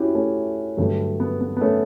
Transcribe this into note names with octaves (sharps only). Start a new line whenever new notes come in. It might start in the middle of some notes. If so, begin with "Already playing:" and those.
Already playing: C#4 E4 F#4 G4
A3 C#4
G2 D3 F#3 A3
B3
B3
B3
A3 C#4